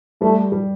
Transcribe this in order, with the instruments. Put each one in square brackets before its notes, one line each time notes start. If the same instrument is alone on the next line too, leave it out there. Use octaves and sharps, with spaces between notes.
[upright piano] G3 [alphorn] A3
[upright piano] G3